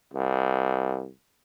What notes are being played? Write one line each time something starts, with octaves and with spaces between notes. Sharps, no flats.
C2